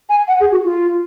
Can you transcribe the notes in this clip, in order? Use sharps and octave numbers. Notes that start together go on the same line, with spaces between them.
G#5
F#5
G#4
F#4
F4